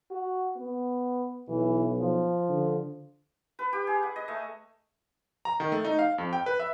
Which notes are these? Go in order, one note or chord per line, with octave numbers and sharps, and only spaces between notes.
F#4
B3
B1 E3
F3
D3
B4
G4
G#4
F#5
D#5
A3
A#5
D#3
A3
D#4
F5
F2
G5
B4
E5